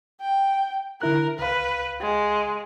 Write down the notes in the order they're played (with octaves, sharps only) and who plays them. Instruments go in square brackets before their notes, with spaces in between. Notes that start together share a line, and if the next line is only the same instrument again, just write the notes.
[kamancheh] G5
[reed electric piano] D3 E4 F#6 [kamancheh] A#4
[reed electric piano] C#2 F5 [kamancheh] B4
[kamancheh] G#3